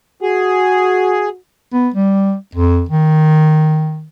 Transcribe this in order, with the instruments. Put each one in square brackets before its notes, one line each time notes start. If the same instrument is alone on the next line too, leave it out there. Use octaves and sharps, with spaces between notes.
[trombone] F#4 [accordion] G#4
[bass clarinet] B3
G3
F2
D#3